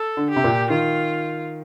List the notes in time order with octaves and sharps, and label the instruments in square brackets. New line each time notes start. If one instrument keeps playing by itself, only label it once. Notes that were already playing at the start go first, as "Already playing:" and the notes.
Already playing: [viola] A4
[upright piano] D3
[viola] G4
[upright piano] C3
A#2
[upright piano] D#3 [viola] F4